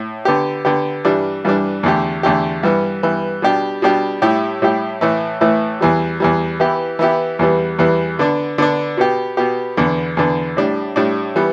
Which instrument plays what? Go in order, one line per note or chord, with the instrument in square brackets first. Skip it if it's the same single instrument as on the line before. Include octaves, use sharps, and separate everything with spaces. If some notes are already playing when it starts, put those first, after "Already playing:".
Already playing: [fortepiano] A2
D3 B3 G4
D3 B3 G4
G2 E3 G3 D4
G2 E3 G3 D4
E2 D3 A3 G4
E2 D3 A3 G4
G2 E3 B3
G2 E3 B3
B2 G3 D4 G4
B2 G3 D4 G4
A2 G3 E4 G4
A2 G3 E4 G4
A2 E3 A3
A2 E3 A3
E2 E3 G3
E2 E3 G3
E3 B3 E4 G4
E3 B3 E4 G4
E2 E3 G3 B3
E2 E3 G3 B3
D3 B3 D4
D3 B3 D4
B2 B3 G4
B2 B3 G4
E2 D3 B3
E2 D3 B3
A2 G3 D4
A2 G3 D4
E3 G3 B3